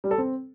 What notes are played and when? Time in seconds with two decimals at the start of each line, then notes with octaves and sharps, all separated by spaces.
0.04 G3
0.11 A4
0.18 C4